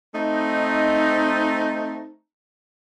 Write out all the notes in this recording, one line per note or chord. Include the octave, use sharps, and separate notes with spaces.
A3 C4 D#4